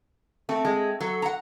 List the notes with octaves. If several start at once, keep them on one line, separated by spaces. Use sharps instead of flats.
A3 C4
G#3
F#3 A4
F#5 A#5